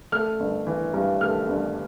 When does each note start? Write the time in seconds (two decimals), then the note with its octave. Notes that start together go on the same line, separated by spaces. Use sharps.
0.12 A3 F6
0.40 G1
0.67 E3
0.94 G2
1.21 A3 F6
1.48 G1